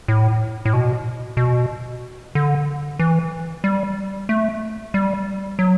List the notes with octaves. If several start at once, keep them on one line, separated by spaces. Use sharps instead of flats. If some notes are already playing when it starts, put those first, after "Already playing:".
A2
A2
B2
B2
D3
E3
G3
A3
G3
F#3